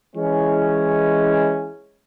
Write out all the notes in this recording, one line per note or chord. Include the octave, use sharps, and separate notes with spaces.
E3 G#3 C#4